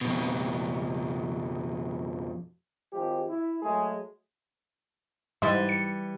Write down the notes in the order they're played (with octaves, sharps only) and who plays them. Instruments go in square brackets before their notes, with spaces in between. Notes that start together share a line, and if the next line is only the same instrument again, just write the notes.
[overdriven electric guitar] F2 B2
[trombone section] G#1 F3 G#3 G4
E4
F#3 G#3 A3 G#4
[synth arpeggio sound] G#2 [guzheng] E3 G3
[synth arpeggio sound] C#7